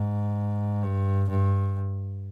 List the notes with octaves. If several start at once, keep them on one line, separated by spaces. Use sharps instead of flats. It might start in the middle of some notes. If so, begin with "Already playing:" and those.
Already playing: G#2
G2
G2